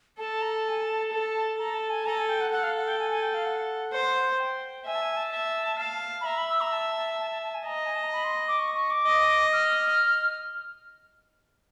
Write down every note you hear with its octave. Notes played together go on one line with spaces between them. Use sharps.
A4 A5
A#5
A5
G#5
A5
A4
A4 A#5
A5
G#5
A4 A#5
G#5
G5
F#5
A4 F#5
F5
F#5
G5
G#5
G#5
G5
F5
F#5
C5
G5
E5 G#5
A5
G#5
A5
E5
F5
B5
E5 A#5
B5
E6
A#5
A5
A5
A5
A5
A5
G#5
D#5 A#5
G#5
A5
A#5
B5
C6
D6
C#6
C#6
D6
D#5
F6